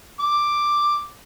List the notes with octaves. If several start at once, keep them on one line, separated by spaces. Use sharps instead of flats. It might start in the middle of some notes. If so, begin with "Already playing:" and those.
D6